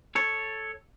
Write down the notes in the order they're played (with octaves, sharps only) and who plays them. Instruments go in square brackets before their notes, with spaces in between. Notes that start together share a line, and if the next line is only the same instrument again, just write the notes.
[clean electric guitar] A4 C#5